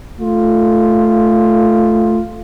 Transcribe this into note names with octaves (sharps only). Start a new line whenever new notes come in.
A3 F4